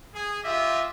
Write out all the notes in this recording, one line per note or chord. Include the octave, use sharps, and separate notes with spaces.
G#4
F4 G4 D#5 E5